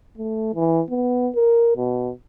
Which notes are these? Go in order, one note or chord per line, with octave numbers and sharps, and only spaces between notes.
A3
E3
B3
A#4
B2